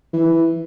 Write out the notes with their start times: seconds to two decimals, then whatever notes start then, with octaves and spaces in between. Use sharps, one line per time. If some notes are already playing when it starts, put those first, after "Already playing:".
0.14 E3